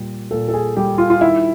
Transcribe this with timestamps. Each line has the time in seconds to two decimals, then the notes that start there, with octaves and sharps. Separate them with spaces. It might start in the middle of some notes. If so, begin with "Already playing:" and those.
Already playing: A#2 G3
0.31 A#2 A4
0.48 A4
0.54 G#4
0.77 G3 G4
0.98 F4
1.10 F4
1.21 D#3 E4